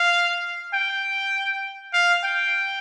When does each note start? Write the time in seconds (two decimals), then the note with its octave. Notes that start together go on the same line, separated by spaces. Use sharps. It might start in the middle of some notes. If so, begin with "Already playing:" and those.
Already playing: F5
0.74 G5
1.93 F5
2.24 G5